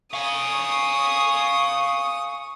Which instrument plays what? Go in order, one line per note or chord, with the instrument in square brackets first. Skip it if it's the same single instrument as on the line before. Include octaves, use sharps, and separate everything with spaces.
[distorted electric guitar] F5 G#5 [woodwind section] C#6 [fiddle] D#6